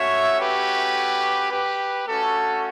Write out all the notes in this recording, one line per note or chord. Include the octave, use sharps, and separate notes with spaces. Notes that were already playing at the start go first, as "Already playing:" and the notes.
Already playing: A3 C#4 F#4 C#5 E5
G4 B4
G4 B4
A3 C#4 F#4 A4